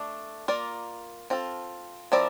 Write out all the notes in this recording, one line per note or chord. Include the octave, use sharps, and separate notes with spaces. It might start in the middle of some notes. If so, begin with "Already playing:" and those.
Already playing: A3 D4
A#3 F4 A#4 D5
C4 F4 A4
F3 C4 E4 A#4 D5